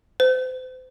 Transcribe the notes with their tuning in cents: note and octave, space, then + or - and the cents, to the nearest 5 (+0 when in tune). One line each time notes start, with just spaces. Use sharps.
C5 -35